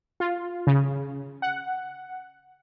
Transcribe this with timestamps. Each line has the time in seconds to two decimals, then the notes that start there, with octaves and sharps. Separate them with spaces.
0.20 F4
0.67 C#3
1.42 F#5